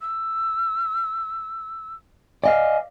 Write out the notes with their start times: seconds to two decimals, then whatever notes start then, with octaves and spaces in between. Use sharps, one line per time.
0.01 E6
2.44 D5 D#5 F5 G#5